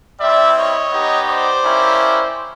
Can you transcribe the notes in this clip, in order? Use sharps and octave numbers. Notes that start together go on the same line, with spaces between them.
G3 C4 E4 D5 E5
C#5 D#5
B3 D#4 G4
C5 D5
A#3 C#4 E4 G4